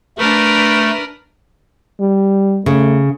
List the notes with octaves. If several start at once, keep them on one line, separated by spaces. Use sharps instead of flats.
A3 D4 A#4 B4
G3
C#3 A3